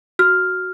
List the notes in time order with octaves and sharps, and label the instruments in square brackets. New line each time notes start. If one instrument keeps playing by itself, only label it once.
[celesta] F#4 F6